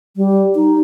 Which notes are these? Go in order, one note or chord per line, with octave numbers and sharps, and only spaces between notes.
G3
D#4